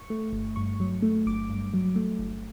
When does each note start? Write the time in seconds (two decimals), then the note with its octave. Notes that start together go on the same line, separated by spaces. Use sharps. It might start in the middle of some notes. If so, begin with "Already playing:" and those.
Already playing: C#6
0.10 A3
0.33 G1
0.56 G2 C#6
0.80 F#3
1.02 A3
1.26 G1 D6
1.50 G2
1.74 F#3
1.96 A3
2.19 G1